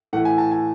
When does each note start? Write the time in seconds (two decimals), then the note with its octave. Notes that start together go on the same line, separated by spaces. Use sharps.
0.13 A2 E3 A3 F#5
0.25 G#5
0.38 A5
0.52 G#5